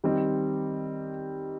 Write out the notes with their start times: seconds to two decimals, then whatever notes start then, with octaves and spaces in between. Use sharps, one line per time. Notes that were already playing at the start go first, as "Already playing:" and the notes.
0.04 D#3 G3 C4